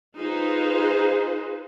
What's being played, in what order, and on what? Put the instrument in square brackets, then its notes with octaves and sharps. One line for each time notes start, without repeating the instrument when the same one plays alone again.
[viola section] D#4 F4 G#4 B4 C5